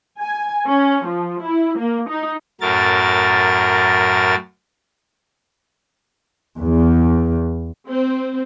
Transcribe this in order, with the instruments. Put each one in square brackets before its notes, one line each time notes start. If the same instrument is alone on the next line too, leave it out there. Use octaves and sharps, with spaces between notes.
[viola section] G#5
C#4
F3
E4
A#3
D#4
[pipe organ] F#2 A2 F#3 A#4 A6
[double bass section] E2
[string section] C4